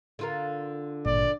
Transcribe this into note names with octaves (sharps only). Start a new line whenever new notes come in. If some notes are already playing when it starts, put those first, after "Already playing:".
D3 F4 A#4
G#1 G2 A#2 D5